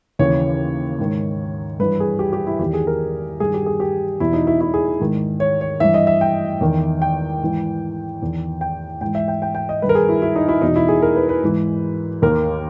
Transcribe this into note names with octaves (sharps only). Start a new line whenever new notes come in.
D#2 C#3 E3 C#5
G#2 D#3
G2 E3 B4
G#4
G4
G4
E4
E2 D#3 G4
G#4
A#4
G2 D#3 G#4
G4
G#4
G4
E2 B2 E4
D#4
E4
E4
G#4
G#2 D#3
C#5
C#5
G2 E3 E5
D#5
E5
G5
E2 D#3
G5
G#2 E3
E2 D#3
G5
G#2 E3 G5
E5
G5
G5
G5
D#5
G2 D#3 B4
A#4
G#4
E4
E4
D#4
E4
E2 B2 D#4
E4
G#4
A#4
B4
B4
G#2 E3
D#2 D#3 A#4